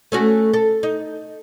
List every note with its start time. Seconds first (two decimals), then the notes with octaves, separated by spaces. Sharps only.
0.12 A3 C#4 F#4
0.53 A4
0.83 D#4